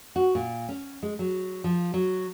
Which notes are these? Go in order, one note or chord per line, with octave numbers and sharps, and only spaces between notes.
F#4
A#2
C#4
G#3
F#3
F3
F#3